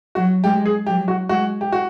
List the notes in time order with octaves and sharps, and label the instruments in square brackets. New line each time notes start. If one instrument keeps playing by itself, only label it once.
[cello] F#3 [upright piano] F#4
[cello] G#3 [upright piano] G4
[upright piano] G#4
[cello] F#3 [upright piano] G4
[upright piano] F#4
[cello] G#3 [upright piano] F#4
[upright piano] G4
F#4